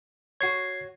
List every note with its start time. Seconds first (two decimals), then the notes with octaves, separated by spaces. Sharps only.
0.41 F#4 C#5 G#6 C7